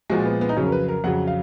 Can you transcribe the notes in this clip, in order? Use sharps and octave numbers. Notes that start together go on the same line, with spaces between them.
A#2 F3 G#3 F#4
B3
B3
D#4
F2 C#3 F#3 C#4
A#4
B4
A#4
F2 C#3 F#3 F#5
F5